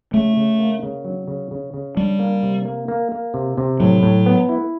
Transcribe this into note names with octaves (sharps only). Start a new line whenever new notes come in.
C#3 A3
C#3
A#3
C#3
F#3
C#3
C#3
C#3
G3 D4
A#3
C3
A#3
A#3
A#3
C3
C3
A2 F#3
A2
B3
E4